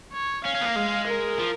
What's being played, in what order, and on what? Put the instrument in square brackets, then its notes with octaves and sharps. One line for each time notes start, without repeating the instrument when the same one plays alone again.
[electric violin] C#5
[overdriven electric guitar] C#4 [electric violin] F5
[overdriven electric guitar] C#4
B3
A#3
G#3
[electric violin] A#4
[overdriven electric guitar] F3